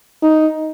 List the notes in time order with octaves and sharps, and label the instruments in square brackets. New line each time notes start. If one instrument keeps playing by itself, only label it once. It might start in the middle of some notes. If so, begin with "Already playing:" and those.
[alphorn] D#4